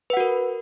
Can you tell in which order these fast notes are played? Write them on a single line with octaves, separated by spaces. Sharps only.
B4 F#5 F#4 A#4